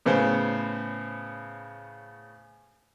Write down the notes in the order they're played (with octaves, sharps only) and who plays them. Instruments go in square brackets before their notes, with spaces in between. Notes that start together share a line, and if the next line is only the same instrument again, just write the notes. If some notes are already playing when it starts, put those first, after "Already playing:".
[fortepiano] A2 C#3 B3 C5